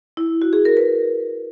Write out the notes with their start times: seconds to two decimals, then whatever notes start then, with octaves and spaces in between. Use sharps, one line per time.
0.17 E4
0.42 F#4
0.53 G#4
0.65 A#4
0.77 B4